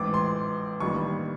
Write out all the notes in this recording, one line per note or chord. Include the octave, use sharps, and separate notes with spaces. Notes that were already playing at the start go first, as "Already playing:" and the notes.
Already playing: A1 G#2 E3 D6
C6
A1 G2 D#3 G3 A#3 C#6